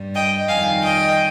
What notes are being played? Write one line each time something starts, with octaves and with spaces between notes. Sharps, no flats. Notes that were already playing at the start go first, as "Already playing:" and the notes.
Already playing: G2 G3
D#5 G5
F2 D#3 G3 F5 G#5
D#5 G5